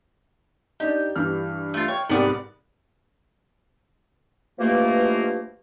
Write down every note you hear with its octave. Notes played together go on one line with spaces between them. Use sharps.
D4 D#4 G4
G2 E3 F6
A3 F4
C#5 G5
C2 G#2 B3 G4 D5
G2 B2 E3 F3 A3 A#3